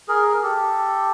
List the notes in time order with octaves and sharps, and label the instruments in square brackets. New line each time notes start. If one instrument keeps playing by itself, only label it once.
[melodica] G#4 A#4
G4 A4